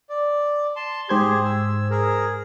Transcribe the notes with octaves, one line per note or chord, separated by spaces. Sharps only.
D5
A5 C6
G#2 G4 G#4 C5 G#6
E6
G#4 A#4